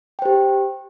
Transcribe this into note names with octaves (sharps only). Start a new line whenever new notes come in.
G4 C5 G5